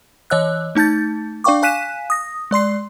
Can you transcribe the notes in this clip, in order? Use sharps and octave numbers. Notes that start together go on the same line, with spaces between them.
E3 C#5 D#5 E6 F#6
A3 D#4 A5 G6 A6
D4 D5 F5 G5 C#6 D6
F5 G#5 F#6 B6 D#7 E7
D#6 A#6
G#3 D5 C6 C7